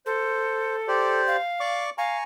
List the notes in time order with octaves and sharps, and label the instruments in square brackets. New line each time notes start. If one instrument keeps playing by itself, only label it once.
[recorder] A4 [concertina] C5
[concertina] G4 C5 D5
[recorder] F5
[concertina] D5 C#6 D6
[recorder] F5 [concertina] G#5 A#5 C#6